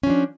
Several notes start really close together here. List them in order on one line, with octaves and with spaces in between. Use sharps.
C#4 F3 D4